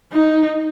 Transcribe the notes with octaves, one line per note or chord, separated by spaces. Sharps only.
D#4